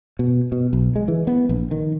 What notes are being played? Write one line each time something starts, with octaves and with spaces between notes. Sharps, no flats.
B2
B2
B1
G#3
E3
B3
A#1
D#3